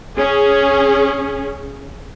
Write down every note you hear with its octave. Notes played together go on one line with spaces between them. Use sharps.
C#4 G#4